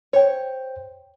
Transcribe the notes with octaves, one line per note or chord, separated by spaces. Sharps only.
C5 C#5 G5